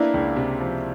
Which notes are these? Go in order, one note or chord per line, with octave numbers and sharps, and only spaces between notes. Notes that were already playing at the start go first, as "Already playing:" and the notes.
Already playing: A#3 B3 D4 E4
C#2
C3
F3